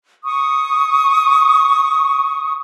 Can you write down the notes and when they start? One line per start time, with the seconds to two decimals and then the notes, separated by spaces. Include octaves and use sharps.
0.25 C#6 D#6